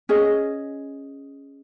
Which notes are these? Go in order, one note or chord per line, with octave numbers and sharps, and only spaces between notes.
C#4 G#4 D#5